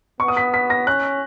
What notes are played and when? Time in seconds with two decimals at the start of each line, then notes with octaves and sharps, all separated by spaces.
0.20 B3 C#6
0.28 D#6
0.37 B6
0.54 B6
0.70 A#6
0.87 C#4 F#6